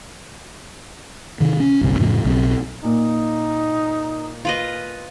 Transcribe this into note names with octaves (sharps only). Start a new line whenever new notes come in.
C3 D#3
C#4
G1 C2 C3
F2 A2 C#3 F3
B1 F#3 C4
A#2 D#4
F4 B4 D#5